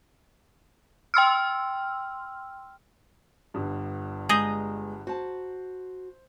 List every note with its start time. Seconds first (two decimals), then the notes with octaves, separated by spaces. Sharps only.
1.14 G5 C6 E6 F6
3.54 G1 G2
4.29 G#3 G#4 D#5 A#5 D#6 G6
5.07 F#4 C5 A5